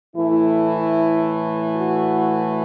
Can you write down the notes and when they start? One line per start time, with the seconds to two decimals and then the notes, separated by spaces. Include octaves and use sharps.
0.16 A2 E3 A3 E4
1.76 F#4